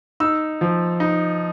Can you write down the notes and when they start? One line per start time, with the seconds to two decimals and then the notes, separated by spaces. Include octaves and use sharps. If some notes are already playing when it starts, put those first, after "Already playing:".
0.20 D#4 E6
0.61 F3
1.00 D#4